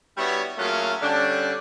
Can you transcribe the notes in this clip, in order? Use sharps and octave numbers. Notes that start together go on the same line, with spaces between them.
G3 B3 D4 E4 F#4 C#5
F#3 A3 A#3 C#4 F4 G#4
D3 G3 C#4 D4